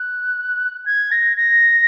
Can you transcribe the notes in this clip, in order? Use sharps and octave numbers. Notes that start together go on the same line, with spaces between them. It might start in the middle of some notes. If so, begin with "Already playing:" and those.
Already playing: F#6
G#6
A#6
A#6